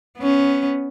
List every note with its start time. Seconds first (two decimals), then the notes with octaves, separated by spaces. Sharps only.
0.18 B3 C#4